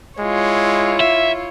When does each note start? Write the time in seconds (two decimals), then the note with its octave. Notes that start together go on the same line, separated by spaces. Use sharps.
0.19 G#3 E4 F4 C#5
1.00 E5